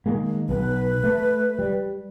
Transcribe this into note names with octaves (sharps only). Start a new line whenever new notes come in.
D#3 G#3 A#3
B1 B4
A3
G3